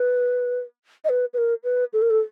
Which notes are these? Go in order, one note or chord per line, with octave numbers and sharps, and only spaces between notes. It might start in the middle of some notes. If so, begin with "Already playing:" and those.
Already playing: B4
D#5
B4
B4
A#4
B4
A4
A#4
A4